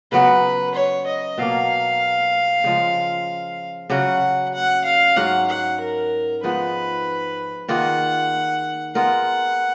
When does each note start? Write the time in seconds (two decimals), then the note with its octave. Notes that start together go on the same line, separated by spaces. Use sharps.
0.12 C#3 F#3 B3 B4
0.75 C#5
1.07 D#5
1.38 B2 F#3 A#3 F5
2.64 C#3 F3 G#3
3.90 C#3 F#3 C#4 F#4 F#5
4.54 F#5
4.85 F5
5.16 G#2 F#3 C#4 F#5
5.48 F#5
5.80 A#4
6.43 F3 G#3 B3 D#4 B4
7.68 D#3 A#3 F4 G#4 F#5
8.95 G#3 B3 F4 A#4 F#5